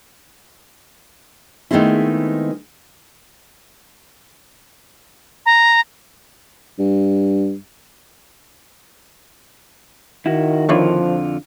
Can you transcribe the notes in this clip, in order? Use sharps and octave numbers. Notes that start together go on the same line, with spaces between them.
D#3 G#3 A3 B3 C4 E4
A#5
G2
D#3 E4 F#4
F2 D3 F3 D4 E4 F4 C#5